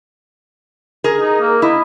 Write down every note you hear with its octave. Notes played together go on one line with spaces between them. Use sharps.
G#4 A#4
D#4
A#3
E4 D#5